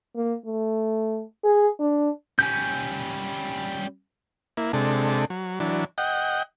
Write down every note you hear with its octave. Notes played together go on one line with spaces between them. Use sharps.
A#3
A3
G#4
D4
G3 C#4 G#5 G6
A#3 E4
C3 G#3 D4 A4
F#3
E3 F#3 D4
D#5 F#5 G5